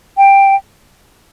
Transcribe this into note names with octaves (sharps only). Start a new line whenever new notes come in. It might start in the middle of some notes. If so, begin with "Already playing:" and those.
G5